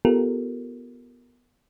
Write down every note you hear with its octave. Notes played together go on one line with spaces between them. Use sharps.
B3 F4 G4 A4 A#4